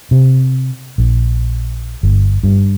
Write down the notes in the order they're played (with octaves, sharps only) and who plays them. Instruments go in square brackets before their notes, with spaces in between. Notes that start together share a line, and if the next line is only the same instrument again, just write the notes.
[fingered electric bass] C3
A#1
G1
G2